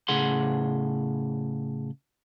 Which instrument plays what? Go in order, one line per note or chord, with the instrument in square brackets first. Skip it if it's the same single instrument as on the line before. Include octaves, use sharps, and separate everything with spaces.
[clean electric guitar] A2 C#3 G#4 F#5 C6